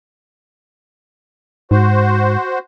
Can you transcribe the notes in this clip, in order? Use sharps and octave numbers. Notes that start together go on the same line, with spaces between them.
G#2 F#4 C5